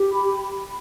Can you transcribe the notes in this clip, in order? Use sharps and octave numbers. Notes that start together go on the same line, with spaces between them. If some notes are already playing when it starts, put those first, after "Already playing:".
Already playing: G4
B5
B5